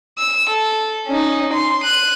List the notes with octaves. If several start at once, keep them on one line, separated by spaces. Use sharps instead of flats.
E6
A4
C#4 D#4
C6
F#6 D#7